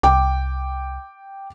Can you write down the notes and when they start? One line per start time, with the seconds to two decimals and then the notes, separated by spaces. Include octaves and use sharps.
0.03 C2 G5 D6